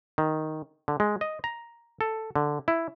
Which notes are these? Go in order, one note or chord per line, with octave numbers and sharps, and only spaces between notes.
D#3
D3
G#3
D#5
A#5
A4
D3
E4